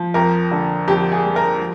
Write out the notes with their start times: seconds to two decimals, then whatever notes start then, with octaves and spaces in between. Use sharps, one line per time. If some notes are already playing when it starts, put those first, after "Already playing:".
Already playing: F3
0.14 F2 A#4
0.51 D3
0.88 F2 G4
1.12 G#4
1.24 G3
1.36 A#4
1.59 F3